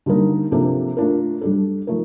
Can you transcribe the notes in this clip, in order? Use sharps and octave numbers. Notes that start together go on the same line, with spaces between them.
D3 G3 A#3 D#4 A#4
C3 F3 A#3 D4 A4
A3 D4 F4 A#4
G3 D4 A4
F3 A3 D#4 A#4